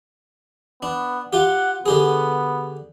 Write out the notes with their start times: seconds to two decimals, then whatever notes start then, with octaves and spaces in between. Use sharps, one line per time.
0.82 B3 D4
1.33 F4 G4 F#5
1.86 D3 B3 G4 G#4